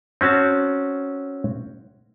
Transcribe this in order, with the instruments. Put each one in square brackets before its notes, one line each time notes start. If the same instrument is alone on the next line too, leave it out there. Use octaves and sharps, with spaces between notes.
[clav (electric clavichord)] C4 C#4 F#4 A5